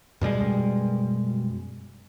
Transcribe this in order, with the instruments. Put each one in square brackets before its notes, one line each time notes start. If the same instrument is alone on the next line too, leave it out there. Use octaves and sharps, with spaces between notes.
[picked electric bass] F#2 B2 G3 G#3